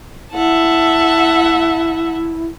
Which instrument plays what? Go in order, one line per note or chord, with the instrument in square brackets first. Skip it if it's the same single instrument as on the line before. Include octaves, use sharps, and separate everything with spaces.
[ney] E4 [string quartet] E5 F#5 A5